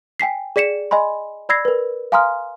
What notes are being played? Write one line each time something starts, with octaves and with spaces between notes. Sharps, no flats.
G5 G#5 B6 C7
G#4 D5 B6 C#7 E7
D#5 G#5 B5 C6
D5 B5 E6 G#6 A#6 C7
A#4 B4
F5 G#5 A#5 C6 D#6 F6